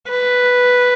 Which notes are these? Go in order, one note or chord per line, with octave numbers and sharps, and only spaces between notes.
B4